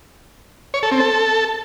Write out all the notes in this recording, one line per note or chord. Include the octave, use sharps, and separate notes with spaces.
C#5
A4
C4
A4